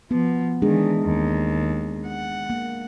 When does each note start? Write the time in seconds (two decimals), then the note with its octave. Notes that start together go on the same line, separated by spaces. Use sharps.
0.11 F3 B3
0.62 D#3 E3 G#3 D4 G#4
1.02 D#2
2.08 F#5
2.50 A#3